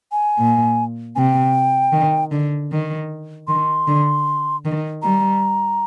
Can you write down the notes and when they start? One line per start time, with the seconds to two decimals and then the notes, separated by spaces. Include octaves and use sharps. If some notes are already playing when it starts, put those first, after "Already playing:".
0.12 G#5
0.37 A#2
1.15 C3 G#5
1.19 G5
1.92 D#3
2.31 D3
2.70 D#3
3.48 D#3 C6
3.87 D3
4.65 D#3
5.02 G3 A#5